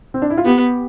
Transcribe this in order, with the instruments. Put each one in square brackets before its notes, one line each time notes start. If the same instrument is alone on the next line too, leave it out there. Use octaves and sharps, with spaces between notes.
[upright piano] C4
D4
E4
F4
[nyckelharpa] B3 [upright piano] G4